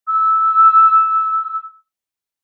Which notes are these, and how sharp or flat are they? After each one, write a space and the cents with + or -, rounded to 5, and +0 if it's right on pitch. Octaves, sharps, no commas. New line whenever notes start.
E6 -10